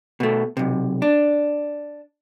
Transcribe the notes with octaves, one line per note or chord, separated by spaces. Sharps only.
B2 A3
B1 C3
D4